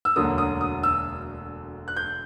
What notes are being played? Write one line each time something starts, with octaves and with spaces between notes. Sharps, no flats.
E6
E1 D2 D3 F#3 A#3 D#6
D#6
D#6
E6
F#6
G6